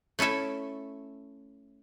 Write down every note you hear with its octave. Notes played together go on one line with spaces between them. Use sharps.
A3 C#4 E4 A4 E5